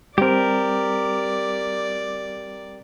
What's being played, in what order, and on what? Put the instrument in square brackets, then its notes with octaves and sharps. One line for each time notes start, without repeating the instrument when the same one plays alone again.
[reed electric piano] G3 C4 [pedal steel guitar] G4 A#4 [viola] D5